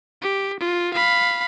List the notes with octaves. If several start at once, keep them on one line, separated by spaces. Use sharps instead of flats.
G4
F4
F5 B5